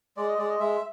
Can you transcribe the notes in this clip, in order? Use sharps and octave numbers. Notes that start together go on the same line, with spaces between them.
G#3 D5
D#5
G#3 D5
D#5
G#3 E5